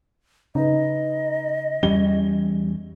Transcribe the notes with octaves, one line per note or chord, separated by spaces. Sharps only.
C#3 D#4 B4 D#5
E2 E3 G3 C#4 G7